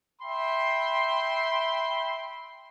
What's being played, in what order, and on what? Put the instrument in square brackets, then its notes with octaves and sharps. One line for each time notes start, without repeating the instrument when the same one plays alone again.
[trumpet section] E5 G5 B5 C6